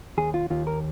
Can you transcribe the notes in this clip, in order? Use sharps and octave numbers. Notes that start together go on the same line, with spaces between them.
D#2 G#4
F4
D#2 F4
A#4